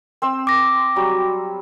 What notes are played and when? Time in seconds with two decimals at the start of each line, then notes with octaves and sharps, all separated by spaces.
0.22 C4 C5 E6
0.47 D6 A#6
0.96 F#3 G3